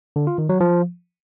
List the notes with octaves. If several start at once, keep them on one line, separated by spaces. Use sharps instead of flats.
D3
F4
D#3
F#3
F3